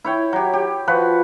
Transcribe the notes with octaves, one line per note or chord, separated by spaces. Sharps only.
E4 C#5 G5
F#3 G4
G4
F3 F#4 B4